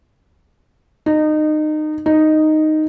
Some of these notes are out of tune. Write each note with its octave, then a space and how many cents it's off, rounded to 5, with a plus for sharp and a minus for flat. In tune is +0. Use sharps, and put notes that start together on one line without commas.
D#4 -25
D#4 -5